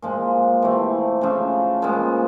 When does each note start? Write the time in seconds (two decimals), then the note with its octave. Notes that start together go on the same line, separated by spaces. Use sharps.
0.02 A#2 F3 G#3
0.62 C3 E3 A3 C4
1.21 C#3 F3 A3 D4
1.82 A#2 F3 G#3 B3